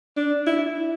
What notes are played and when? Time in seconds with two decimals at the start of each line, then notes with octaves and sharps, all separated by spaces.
0.17 D4
0.47 E4